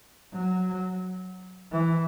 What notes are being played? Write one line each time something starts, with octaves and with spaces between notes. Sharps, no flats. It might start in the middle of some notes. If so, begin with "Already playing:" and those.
F#3
E3